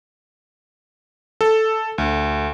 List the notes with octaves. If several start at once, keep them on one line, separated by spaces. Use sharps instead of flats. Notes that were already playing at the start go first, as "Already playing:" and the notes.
A4
D2